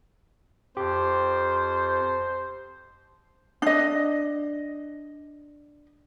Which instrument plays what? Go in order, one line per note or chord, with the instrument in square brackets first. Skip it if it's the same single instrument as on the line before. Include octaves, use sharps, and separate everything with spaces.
[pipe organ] F2 [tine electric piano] G4 [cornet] C5
[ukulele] D4 D#5